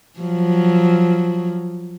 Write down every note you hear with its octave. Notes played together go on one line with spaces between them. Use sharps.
F3 F#3